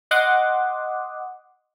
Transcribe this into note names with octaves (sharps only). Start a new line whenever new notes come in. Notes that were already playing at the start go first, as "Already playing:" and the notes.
D#5 F#5 C6 D6 D#6